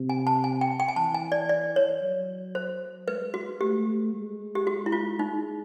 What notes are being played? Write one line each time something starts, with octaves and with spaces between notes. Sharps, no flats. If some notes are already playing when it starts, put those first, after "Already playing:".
Already playing: C3
G#5
A5
G#5
G5
G5
G#5
E3 A5
G#5
D5
D5
C#5
F#3
C5
G#3 B4
F#4
A3 G4
G#3
G4
F#4
E4
F4
G#3 D#4